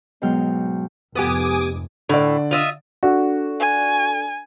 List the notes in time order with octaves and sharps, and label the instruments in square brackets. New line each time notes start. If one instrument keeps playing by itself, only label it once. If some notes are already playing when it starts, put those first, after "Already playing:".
[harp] G#2 B2 F#3 G5 F6
[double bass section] F1 F2 G#2 [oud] B3 G4 [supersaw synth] G#5 D6 D#6
[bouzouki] A2 [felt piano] D3 D5
[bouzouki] F4 D#5 E5
[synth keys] D4 A4 D5 [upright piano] F#4
[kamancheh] G#5